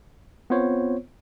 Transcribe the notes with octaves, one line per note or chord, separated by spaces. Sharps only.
B3 C4 F4 C5 C#5